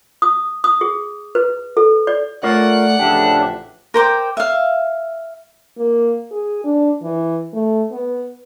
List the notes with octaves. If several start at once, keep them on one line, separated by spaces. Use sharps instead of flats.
D#6
D#6
G#4
B4
A4
D5
A3 F4 A#4 C#5 D5 F#5
A1 C#3 F3 D4 G4 E5
A#4 C5 G5 D6
E5 F5
A#3
G#4
D4
E3
A3
B3